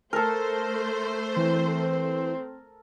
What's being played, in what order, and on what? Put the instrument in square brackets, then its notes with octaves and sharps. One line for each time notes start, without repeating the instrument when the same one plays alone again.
[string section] A3 C5 [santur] A4 A#4
[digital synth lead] E3 [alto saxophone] C4